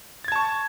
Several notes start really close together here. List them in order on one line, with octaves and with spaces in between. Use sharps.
A6 G#6 A5 C#6